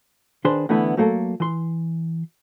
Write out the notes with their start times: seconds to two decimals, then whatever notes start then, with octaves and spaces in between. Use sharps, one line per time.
0.45 D#3 D4 G#4 B4 C5 C6
0.69 D3 E3 A3 B3 E4
0.97 F#3 A3 A#3 A4
1.40 E3 C6